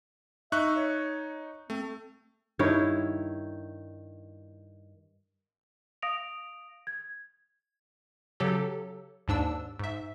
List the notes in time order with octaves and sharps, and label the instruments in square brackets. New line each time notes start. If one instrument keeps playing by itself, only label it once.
[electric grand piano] D#4 C#6 F#6 [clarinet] E5
[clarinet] C#5
[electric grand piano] A3 [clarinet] C4
[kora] G2 D#3 E4 C#5
[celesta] F5 D#6 A#6 D7 F7
G#6
[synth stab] C#3 F#3 G4 A4
D#2 G#2 D4 E6
G#2 E5